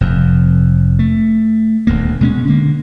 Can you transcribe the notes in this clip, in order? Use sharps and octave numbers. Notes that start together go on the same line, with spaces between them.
F1 F2
A3
D#1 D2 A#3
B2 G#3 A#3 C#4
D3 A#3